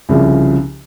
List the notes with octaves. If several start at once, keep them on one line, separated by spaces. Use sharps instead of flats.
C2 C#3 F3